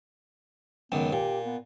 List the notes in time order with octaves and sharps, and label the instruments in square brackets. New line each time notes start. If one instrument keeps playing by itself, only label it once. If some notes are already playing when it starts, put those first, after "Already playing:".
[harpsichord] C#2 F#2 D#3 [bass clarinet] B3
[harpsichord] A#2 [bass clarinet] G4
[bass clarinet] B3